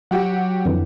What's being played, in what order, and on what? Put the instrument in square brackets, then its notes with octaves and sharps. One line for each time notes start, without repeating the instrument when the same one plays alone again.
[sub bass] F#3 [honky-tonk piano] F#4 G4 F#5
[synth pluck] F2 D3 E3